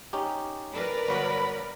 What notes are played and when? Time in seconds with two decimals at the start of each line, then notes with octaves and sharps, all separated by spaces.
0.13 C#4 D#4 G4
0.72 A#4 B4 D5
1.08 G1 F#3 B5